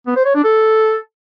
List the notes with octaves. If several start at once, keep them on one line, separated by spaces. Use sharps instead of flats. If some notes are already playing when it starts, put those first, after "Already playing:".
B3
C5
C#5
D4
A4